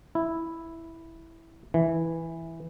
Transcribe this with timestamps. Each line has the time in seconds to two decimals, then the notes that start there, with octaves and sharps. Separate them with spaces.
0.15 E4
1.74 E3